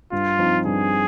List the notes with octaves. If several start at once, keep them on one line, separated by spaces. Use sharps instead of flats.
G2 F4
F3 C4 D#4
G2 G#4